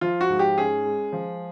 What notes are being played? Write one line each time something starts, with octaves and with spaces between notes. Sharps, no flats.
F3 F4
F#4
G#2
G4
C#4 G#4
G#3
F3